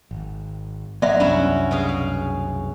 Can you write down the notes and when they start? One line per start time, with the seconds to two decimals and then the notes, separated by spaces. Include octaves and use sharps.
0.11 G#1
1.02 F#3 B3 D5 E5
1.20 C2 F#2 C#4 D4 E4 F#4
1.71 B2 G#4 F5
1.89 F5